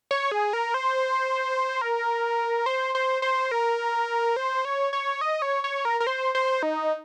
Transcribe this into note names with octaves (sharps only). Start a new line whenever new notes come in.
C#5
G#4
A#4
C5
A#4
C5
C5
C5
A#4
C5
C#5
C#5
D#5
C#5
C#5
A#4
A#4
C5
C5
D#4